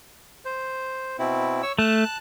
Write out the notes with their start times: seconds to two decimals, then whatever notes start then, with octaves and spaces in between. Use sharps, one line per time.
0.45 C5
1.19 B2 C4 E4
1.63 C#5 E6
1.79 A3 A5 F#6